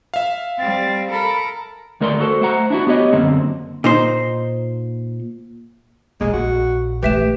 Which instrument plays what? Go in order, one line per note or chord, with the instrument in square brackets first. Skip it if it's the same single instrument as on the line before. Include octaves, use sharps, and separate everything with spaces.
[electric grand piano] E5 F5
[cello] G3 C4 [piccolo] A6
[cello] A4 A#4 [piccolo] B5
[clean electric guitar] D2 A3 A#4 D5 C6
F#4 A4 C5
A3 C5 F#5 A#5
D4 E4 F#4
B3 G4 C#5 D#5
F#2 D3 A#3 C4
[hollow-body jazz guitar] A#2 D#4 C5
[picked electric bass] E1 B1 A#3 [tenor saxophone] G#3
[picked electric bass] A#1 [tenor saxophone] F#4
[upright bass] E3 A3 [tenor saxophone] G4 [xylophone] B4 E5 E7